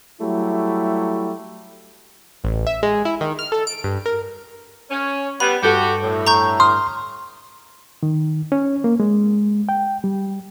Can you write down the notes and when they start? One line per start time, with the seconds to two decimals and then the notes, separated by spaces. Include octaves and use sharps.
0.21 F#3 G3 A3 E4 G4
2.44 A1
2.67 E5
2.83 G#3
3.05 E4
3.21 D#3
3.39 F6
3.52 A4
3.67 D7
3.84 G2
4.06 A#4
4.90 C#4
5.40 G3 B3 B5
5.62 G2 F#4 G4 A4
6.02 A2
6.27 A#5 C#6 G6
6.60 C6 D#6 F6
8.03 D#3
8.52 C#4
8.84 A#3
9.00 G#3
9.69 G5
10.04 G3